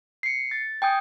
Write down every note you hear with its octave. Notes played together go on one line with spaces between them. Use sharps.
C7 C#7
A6
G5 G#5 D#6 G6